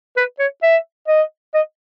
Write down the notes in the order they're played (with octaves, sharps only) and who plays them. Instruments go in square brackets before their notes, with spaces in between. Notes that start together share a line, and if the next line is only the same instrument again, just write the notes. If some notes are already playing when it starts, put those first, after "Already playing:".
[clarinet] B4
C#5
E5
D#5
D#5